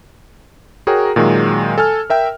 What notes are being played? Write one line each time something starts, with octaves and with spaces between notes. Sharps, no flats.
F#4 G#4 A#4 C#5 G5 A#5
A#2 D#3 F#3 G#3
A4 G#5 A5 F6
A#4 E5 G5